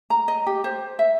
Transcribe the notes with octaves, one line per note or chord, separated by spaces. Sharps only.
A#5
D#5
G4
C5
E5